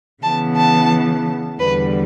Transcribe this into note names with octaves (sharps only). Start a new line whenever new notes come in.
C#3 E3 B3 A5
A5
E2 D3 G3 B4